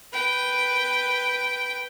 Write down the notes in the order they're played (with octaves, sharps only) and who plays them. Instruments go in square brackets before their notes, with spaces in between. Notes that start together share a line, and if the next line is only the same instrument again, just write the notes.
[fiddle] B4 G5